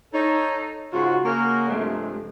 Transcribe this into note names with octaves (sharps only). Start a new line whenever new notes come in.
D#4 A4 C#5
G#2 C#3 F4 F#4
C#3 A#3 C#4 F#4 G#4 A#4
G2 C3 F3 G#3 A3